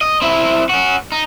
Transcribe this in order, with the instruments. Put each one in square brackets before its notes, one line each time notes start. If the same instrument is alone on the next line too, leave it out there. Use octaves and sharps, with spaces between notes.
[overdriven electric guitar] D#5
C4 E4
C#4 F#4
D#4